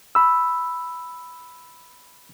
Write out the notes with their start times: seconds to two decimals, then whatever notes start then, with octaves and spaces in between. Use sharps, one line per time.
0.15 B5 E6